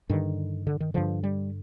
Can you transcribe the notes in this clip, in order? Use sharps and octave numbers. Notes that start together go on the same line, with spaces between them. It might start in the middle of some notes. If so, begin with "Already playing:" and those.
G2 D3 D#3
D3
D#3
G2 D3 F3
G3